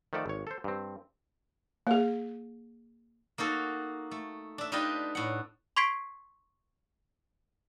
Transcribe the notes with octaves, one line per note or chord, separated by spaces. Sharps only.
D#3 F3 A3 A4 D5
G#1 C#5
A4 C5
G2 C4
A#3 G#4
A#3 D#4 F#4 A4
A3
D4 E5
D4 D#4 F4 G4 B4 D#5
A2 F#5
C6 C#6 G#6 B6 C7 D7